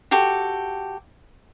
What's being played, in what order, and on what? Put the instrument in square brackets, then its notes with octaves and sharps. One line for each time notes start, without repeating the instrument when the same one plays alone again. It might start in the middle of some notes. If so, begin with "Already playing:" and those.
[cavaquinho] F#4 G4 A4